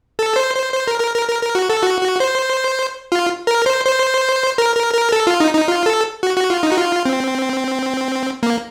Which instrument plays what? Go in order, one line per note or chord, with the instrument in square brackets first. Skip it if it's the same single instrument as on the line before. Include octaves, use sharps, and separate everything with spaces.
[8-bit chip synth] A4
C5
C5
C5
A#4
A#4
A#4
A#4
A#4
F#4
A4
F#4
F#4
C5
F4
A#4
C5
C5
A#4
A#4
A#4
A4
F4
D#4
D#4
F4
A4
F#4
F#4
F4
D#4
F#4
F4
C4
A#3